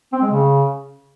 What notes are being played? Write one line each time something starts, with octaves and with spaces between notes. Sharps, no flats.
C4
G#3
C#3